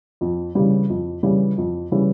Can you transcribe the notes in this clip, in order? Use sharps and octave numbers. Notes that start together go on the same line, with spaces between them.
F2
C#3 E3 G3
F2
C#3 E3 G3
F2
C#3 E3 G3